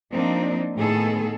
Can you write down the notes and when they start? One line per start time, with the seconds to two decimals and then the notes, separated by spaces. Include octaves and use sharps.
0.10 F3 A#3 C4 D4 D#4
0.76 A2 D#3 B3 G#4 A4